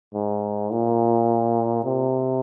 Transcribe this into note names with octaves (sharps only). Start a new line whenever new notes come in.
G#2
A#2
C3